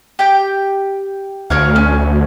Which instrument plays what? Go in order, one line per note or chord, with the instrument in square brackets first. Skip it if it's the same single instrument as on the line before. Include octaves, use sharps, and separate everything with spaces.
[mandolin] G4 G5
[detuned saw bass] D2 [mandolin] A#4 C#5 F5
[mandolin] C#4